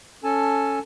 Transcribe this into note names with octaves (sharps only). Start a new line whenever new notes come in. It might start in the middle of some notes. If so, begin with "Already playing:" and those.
C#4 A4 G#5 A5